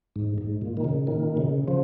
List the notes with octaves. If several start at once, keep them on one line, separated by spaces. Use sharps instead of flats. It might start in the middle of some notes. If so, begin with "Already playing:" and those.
G#2
G#2
A#2
D#3
C#3
A#2 D#3
C#3
C#3 F3